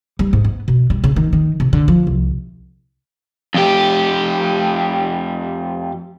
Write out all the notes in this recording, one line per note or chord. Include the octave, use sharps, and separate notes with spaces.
G3
G#2
B3
B2
G3
C#3
D#3
D#3
C3
D3
F3
C2
F2 G4